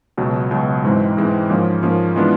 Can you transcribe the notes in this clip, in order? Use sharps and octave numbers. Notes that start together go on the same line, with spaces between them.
C#2 B2 F#3
C#2 B2 F#3
G#2 E3 G#3 C4
G#2 E3 G#3 C4
G#2 F3 A#3 C#4
G#2 F3 A#3 C#4
E3 G#3 B3 D4 F4